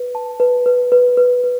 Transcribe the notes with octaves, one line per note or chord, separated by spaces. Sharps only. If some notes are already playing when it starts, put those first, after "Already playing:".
Already playing: B4
A5
B4
B4
B4
B4
B4